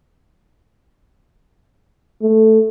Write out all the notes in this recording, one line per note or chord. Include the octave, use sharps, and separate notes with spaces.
A3